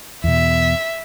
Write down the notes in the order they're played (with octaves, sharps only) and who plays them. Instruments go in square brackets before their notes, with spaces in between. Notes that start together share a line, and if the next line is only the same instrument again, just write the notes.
[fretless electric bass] E2 B2 [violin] E5